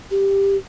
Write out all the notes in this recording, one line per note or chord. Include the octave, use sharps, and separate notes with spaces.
G4